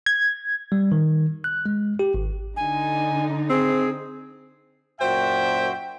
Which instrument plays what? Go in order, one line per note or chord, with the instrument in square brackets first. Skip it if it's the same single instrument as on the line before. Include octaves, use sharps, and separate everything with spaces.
[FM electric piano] G#6
[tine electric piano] G3
D#3
F#6
G#3
G4
G#1
[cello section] D3 D#4 [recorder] G#5
[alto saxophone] C4 [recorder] G#4
[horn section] F#2 A#2 F#4 C5 E5 G5